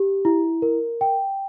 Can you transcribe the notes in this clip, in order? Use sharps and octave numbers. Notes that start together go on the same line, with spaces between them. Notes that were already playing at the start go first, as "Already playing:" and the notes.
Already playing: G4
E4
A#4
G5